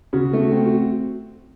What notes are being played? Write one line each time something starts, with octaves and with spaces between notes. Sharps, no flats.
C#3 F#4
A3
F#4
C4
F#4